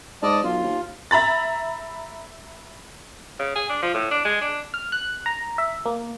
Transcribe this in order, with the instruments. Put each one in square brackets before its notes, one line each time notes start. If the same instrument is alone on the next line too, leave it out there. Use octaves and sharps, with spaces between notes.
[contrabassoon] G#2 [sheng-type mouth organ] D5 D#5 A5
[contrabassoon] B1 [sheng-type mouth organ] F4
[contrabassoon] D#2
[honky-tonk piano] E5 A#5 B5 A6
[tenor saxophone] C#3
G#4
D4
F3
A2
D4
G#3
D4
[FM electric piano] F6
F#6
A#5
E5
A#3